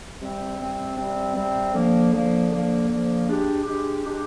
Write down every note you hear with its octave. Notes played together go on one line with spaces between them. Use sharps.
C3 G3 C4
C3 G3 C4
C3 G3 C4
C3 G3 C4
D3 F3 A#3
D3 F3 A#3
D3 F3 A#3
D3 F3 A#3
G#3 D4 G4
G#3 D4 G4
G#3 D4 G4